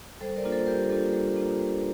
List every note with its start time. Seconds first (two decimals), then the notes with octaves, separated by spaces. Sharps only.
0.21 G3 A4 C5
0.36 A#4 D5
0.44 A#3 D4 F4
0.51 A4 C5
0.67 G3 G4 A#4
0.90 A#3 D4 F4 A4
1.13 G3 A4
1.36 A#3 D4 F4
1.59 G3